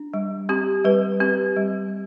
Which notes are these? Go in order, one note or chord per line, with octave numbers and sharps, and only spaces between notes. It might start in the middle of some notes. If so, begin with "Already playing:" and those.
Already playing: D4
G3
C4 G4
G3 B4
C4 G4
G3